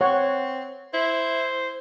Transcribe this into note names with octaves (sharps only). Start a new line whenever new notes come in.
C4 C#5 F#5
E4 C5